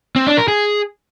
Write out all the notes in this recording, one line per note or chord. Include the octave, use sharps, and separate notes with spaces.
C4
D4
A#4
G#4